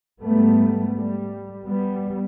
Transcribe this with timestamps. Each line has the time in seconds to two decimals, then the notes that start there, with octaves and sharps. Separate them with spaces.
0.22 G#2 G3 A3 B3
0.96 G3
1.65 G3 B3